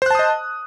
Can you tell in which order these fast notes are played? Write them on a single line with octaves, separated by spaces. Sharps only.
C5 F#6 A5 D#6 D#5